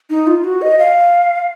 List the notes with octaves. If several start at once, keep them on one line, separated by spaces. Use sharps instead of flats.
D#4
F4
F#4
D#5
F5